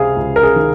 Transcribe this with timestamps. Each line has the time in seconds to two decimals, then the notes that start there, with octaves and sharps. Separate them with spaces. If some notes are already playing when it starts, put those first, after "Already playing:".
Already playing: C#2 C3 G#4 F5
0.16 C#2
0.36 A#4
0.43 G#4
0.56 D#3